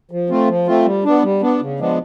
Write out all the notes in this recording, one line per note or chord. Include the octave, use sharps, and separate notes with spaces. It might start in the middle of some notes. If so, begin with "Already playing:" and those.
F3
A3 C4 F4
F3
A3 C4 F4
G3
B3 D4
G3
B3 D4
C#3
F3 G#3 B3 D4